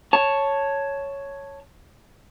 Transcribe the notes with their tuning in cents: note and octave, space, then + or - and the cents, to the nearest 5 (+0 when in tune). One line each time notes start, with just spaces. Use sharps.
C#5 +0 A5 +0